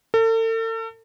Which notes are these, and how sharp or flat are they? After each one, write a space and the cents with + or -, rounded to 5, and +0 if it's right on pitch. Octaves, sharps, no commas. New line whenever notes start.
A4 +40